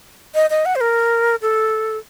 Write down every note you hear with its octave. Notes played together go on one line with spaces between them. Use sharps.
D#5
D#5
F#5
C5
A#4
A4